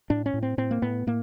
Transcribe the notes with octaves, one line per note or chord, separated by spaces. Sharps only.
A2 D4
C#4
A2
C4
A2 C4
A#3
A2 B3
A2 A#3